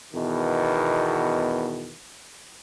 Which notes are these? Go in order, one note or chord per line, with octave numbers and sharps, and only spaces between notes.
E2 B2 D#3